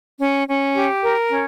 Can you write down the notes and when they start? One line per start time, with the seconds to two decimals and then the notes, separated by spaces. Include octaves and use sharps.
0.20 C#4
0.48 C#4
0.75 G4
1.03 A#4
1.30 C#4